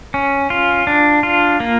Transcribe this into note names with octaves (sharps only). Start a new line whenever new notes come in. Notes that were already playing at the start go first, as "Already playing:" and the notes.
C#4
F4
D4
F4
A#3